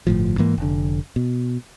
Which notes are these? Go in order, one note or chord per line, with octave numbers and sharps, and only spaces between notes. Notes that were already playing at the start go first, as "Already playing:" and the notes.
G1 A2 F3
G#2 E3 A#3
F1 D3
B2